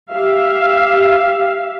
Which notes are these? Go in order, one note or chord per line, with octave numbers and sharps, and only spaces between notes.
G4 E5 F5